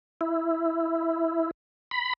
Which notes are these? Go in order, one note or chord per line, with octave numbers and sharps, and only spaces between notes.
E4
B5